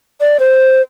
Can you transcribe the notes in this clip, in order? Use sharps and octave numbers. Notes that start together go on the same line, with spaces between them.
D5
C5